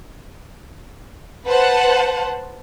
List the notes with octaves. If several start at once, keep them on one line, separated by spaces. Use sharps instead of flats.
B4 C5 F#5 A5